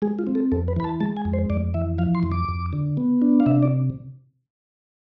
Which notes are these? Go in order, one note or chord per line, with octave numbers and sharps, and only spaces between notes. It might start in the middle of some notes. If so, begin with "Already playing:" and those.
G#3 G#4
F4
C4
A4
F2 A4
B4
E3 B5
A5
G#3 A5
G#5
F2
C5
F2 D5
E3 E5
F3 F5
C6
F2
D6
F2
D3
B3
D4
F5
C3 E5
D5